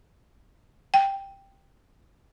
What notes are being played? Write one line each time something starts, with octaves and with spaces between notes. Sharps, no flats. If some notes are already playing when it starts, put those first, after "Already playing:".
G5